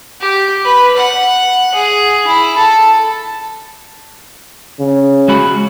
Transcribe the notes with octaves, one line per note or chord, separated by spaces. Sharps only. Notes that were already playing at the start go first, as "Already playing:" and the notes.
G4
B4
F#5
G#4
E4
A4
C#3
G#3 F#4 B5